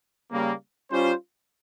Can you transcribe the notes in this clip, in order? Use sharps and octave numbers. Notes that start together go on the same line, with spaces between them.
C#3 G3 A#3
G3 C#4 F4 C5